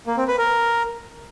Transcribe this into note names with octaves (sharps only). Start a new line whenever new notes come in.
A#3
C4
B4
A#4